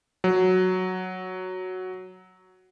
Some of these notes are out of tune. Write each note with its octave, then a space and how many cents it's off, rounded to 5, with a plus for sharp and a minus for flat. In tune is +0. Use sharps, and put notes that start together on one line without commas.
F#3 +0